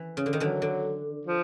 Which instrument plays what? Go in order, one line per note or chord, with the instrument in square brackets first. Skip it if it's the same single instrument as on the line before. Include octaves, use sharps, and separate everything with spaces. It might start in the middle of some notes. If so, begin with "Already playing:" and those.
Already playing: [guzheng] E3
C#3
D3
D#3
[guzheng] D3 E3 [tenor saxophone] F#3
[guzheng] D3
[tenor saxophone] F3